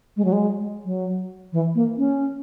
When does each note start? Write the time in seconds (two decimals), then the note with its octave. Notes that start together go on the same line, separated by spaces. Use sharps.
0.17 G#3
0.25 F#3
0.33 G#3
0.85 F#3
1.53 E3
1.75 A#3
1.98 C#4